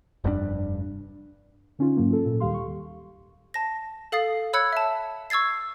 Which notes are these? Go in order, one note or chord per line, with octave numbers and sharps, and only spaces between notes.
F1 G2 A#2 D4
D3 C#4 D#4 F4
G#2 F#3 A#3
F4 A4
A#2
D#2 D#3 G3 G4 F5 C6
C#6
A5 A#6
A4 F5 D#6 A6 C7
C#5 B5 E6 F#6 G#6 C#7
E5 A5
C#6 E6 G#6 A6 C7